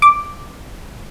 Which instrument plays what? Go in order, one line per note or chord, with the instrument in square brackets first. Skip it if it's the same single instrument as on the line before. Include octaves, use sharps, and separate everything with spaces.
[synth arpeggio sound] D6